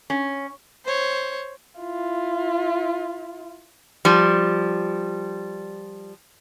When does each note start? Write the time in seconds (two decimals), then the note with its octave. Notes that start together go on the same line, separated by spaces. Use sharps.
0.10 C#4
0.84 C5 C#5
1.80 E4 F4
4.05 F3 G3